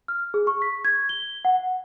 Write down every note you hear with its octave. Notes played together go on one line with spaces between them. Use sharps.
F6
G#4
C#6
B6
G#6
G7
F#5